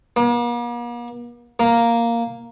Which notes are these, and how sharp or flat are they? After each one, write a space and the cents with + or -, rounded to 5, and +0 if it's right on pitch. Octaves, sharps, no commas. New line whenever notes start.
A#3 +45
A#3 +0